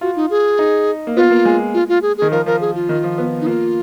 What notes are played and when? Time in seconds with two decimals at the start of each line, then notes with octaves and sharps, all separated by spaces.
0.01 F4 F#4
0.16 D#4
0.30 G#4
0.59 D#4
1.07 A#3
1.16 B3 F4
1.30 A#3
1.45 G#3
1.74 F4
1.89 F4
2.02 G#4
2.18 D#3 G#4
2.32 F3 A#4
2.46 F3 A#4
2.61 G#4
2.75 F4
2.89 D#3
3.04 F3
3.18 B3
3.41 D#4
3.46 A#3 F4